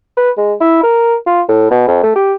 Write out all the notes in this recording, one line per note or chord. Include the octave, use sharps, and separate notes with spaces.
B4
G#3
E4
A#4
F4
A2
B2
F2
A3
G4